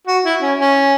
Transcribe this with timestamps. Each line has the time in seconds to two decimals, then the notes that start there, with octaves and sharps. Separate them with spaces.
0.07 F#4
0.25 E4
0.42 C#4
0.59 C#4